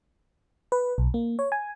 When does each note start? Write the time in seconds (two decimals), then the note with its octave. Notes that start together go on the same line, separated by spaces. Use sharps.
0.72 B4
0.98 B1
1.14 A#3
1.39 C#5
1.52 G#5